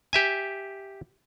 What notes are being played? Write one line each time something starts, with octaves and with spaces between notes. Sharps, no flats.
G4 E5 G#5